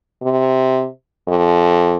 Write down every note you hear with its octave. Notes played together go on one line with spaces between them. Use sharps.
C3
F2